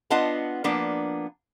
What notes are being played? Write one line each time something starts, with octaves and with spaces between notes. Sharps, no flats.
B3 D4 F4 D#5 F#5 A5
F3 A#3 B3 D4